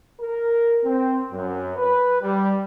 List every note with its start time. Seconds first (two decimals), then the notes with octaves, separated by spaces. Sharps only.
0.21 A#4
0.84 C4
1.32 F#2
1.76 B4
2.21 G3